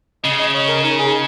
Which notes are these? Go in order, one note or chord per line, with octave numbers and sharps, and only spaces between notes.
C#3 D#5
D#5
C#5
A#4
D#4
G#4